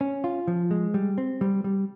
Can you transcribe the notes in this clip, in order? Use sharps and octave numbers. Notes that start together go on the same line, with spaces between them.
C#4
F4
F3
G#3
G3
C4
G3
G3